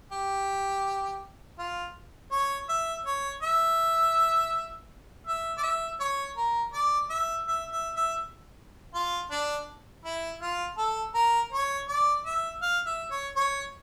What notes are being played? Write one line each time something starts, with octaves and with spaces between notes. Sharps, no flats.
G4
F4
C#5
E5
C#5
E5
E5
D5
E5
C#5
A#4
D5
E5
E5
E5
E5
F4
D4
E4
F4
A4
A#4
C#5
D5
E5
F5
E5
C#5
C#5